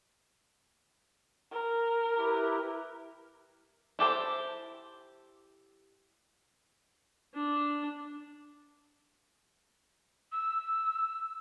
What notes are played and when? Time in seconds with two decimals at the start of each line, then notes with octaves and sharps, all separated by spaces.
1.52 A#4
2.17 E4 G4 B4
3.99 E4 G4 A4 C5
7.34 D4
10.32 E6